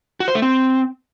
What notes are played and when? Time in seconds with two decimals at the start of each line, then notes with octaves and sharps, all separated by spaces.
0.20 F#4
0.28 C5
0.35 A3
0.42 C4